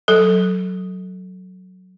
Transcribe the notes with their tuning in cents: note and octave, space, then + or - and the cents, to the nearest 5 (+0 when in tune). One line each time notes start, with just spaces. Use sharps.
F#3 +0 A4 +0